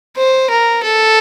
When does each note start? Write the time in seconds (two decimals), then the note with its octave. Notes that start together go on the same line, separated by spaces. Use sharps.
0.17 C5
0.50 A#4
0.83 A4